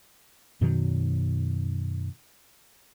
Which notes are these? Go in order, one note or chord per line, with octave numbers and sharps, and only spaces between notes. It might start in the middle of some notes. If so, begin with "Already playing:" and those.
F#2 B2 D#3 F#3